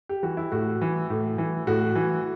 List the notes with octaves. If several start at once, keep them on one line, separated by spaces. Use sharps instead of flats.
G4
E3 F#4
E4
A2 F#4
E3
A2
E3
A2 F#4
E3